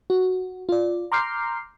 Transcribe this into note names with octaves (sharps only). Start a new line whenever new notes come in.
F#4
F4 D5
A#5 C6 D6 F6 G6 C7